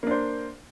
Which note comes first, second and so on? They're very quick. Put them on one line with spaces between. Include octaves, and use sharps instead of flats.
A#3 D4 C5